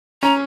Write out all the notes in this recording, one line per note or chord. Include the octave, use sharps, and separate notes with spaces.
C#4 A#5